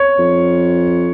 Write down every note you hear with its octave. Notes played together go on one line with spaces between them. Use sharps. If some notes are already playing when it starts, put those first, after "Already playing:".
Already playing: C#5
F2